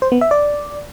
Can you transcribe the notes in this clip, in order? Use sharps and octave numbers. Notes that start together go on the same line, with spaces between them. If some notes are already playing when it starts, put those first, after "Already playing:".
C5
B3
E5
D5